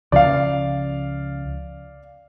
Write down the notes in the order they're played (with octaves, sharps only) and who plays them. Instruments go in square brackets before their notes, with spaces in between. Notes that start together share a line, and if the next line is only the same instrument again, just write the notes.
[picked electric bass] C#2 C#3 F3 [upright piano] D5 F5